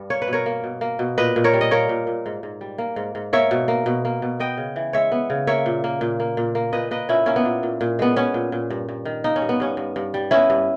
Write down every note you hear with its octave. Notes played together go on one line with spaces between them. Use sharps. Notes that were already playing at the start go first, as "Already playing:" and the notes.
Already playing: G2 G3
A#3 C#5
B4
B2
A#4 C#5
A#3
B2
A#3
B2
A#2 B4 D#5
A#2
A#4 C#5
G3
D#5
A#3 A#4 C#5
A#2
A#2
G#2
G#2
G3
A#3
G#2
G#2
A#3 C#5 E5
B2
A#3
B2
A#3
B2
B3 D#5 G5
C#3
E3
G#3 C#5 E5
B3
C#3
A#3 C#5 E5
A#2
A#3
A#2
A#3
A#2
A#3
A#2 B4 D#5
A#3 B4 D#5
A#2 C#4 E4
A#3 C#4
B3
A#2
A#2
A#2
G#3 B3
B3 C#4
A#2
A#2
G2
G2
D#3
A#3 D#4
C#4
G2
B3
G2 C#4
G2
G2
G3
B3 C#4 E4
G2